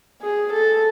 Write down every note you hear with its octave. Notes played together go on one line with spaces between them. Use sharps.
G#4
A4